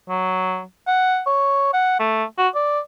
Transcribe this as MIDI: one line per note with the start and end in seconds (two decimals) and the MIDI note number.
0.09 0.62 54
0.87 1.21 78
1.27 1.72 73
1.73 1.96 78
1.99 2.24 57
2.38 2.48 66
2.55 2.80 74